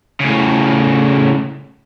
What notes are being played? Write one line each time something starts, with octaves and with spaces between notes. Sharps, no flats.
A2 C#3